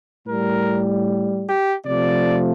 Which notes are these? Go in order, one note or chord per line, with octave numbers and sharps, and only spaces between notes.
A2 G3 A#4
G4
C3 F3 A3 D5